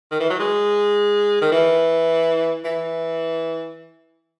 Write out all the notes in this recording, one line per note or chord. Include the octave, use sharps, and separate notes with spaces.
D#3
E3
F#3
G#3
D#3
E3
E3